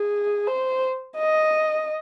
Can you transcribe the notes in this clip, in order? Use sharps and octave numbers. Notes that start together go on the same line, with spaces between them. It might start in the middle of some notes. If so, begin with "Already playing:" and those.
Already playing: G#4
C5
D#5